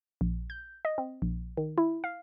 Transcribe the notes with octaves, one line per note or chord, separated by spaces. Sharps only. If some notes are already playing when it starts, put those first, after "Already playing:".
A#1
G6
D#5
C4
A#1
D#3
E4
F5